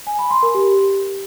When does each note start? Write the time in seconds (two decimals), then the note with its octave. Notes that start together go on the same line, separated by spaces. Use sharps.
0.07 G#5
0.19 B5
0.31 C6
0.43 A#4
0.55 G4